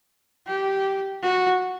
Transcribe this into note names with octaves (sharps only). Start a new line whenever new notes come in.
G4
F#4